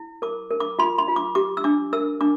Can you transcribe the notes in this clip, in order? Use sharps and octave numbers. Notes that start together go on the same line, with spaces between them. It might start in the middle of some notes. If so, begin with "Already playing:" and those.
Already playing: E4
A#4 D6
A#4
D6
F4 C6
C6
F4
D6
G4 D6
E6
D4 D6
A#4 E6
D4 D6